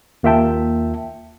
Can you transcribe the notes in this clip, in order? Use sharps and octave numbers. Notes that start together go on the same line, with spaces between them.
D#2 A#3 F4 E5 G5 A5